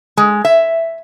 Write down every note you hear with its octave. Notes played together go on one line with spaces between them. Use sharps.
G#3
E5